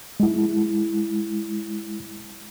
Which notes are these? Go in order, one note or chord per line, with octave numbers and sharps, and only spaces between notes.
G#3 E4